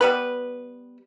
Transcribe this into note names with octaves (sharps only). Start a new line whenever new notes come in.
G3 B3 B4